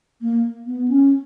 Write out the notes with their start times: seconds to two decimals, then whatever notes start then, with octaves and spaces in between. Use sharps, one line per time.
0.21 A#3
0.66 B3
0.88 C#4